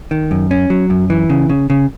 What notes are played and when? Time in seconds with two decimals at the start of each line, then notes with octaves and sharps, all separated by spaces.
0.11 D#3
0.31 F#2
0.51 C#4
0.70 F#3
0.90 F#2
1.10 E3
1.30 C#3
1.49 C#3
1.70 C#3